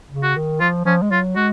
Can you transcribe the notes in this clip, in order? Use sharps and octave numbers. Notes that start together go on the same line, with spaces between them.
C#3
F#4
D#3
F3 F4
F3 C#4
G#3
F#3 F4
G#3 F#4